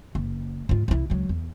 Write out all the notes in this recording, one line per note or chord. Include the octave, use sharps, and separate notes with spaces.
F#1
G#2 F4
C2 E4
C#2 F#3
E2